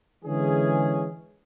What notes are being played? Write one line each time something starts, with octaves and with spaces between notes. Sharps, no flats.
D3 E3 G#3 C#4 G#4